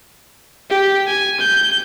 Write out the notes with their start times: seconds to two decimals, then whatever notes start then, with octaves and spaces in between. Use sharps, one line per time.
0.70 G4
1.06 G#5
1.40 G6